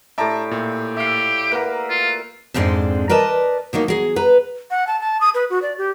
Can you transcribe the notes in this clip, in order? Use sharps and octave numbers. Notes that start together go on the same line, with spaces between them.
A2 G4 D5 E5 A5 A#5
A#2
G4 E5 F5
A#3 A#4 B4 F#5
F4
F2 G#2 G#3 C4 D4
A#4 B4 D5 D#5 A5
F3 F#3 A#3 D#4
F#3 G#4
B4 A#5
F#5
A5
A5
D#6
B4
F#4
D5
G4